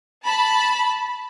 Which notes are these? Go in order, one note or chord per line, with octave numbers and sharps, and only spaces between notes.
A5 B5